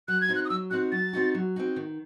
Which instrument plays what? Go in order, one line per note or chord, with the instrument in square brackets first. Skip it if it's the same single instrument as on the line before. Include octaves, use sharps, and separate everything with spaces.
[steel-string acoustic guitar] F#3 [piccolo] F#6
[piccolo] G#6
[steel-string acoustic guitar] C4 D#4 F#4
[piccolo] F#6
D#6
[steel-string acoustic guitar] F#3 [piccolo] E6
[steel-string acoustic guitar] C4 D#4 F#4 [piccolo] F#6
[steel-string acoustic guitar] F#3 [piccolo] A6
[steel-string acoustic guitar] C4 D#4 F#4
F#3
C4 D#4 F#4
D#3